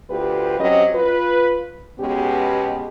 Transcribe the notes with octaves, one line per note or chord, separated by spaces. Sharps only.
D2 F4 G4 B4
F#3 C4 C#4 G4 D#5
F4 B4
B2 G#3 B3 C#4 G4